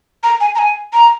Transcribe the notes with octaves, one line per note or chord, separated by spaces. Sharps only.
A#5
G#5
A#5
G#5
A#5